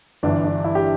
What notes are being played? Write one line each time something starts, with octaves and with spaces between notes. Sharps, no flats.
G1 G2 E3 D4
D4
E4
G4